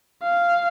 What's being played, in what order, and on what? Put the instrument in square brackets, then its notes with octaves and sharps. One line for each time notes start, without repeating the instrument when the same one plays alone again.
[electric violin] F5